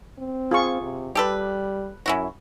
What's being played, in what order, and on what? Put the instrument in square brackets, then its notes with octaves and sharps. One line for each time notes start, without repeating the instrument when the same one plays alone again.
[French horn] C4
[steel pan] F4 G#4 C#6
[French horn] C3
[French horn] G3 [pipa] G4 A4 B4
[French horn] F#2 [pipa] C#4 E4 F#4